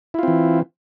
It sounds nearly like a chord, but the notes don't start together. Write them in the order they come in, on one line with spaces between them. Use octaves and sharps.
E4 F4 C4 E3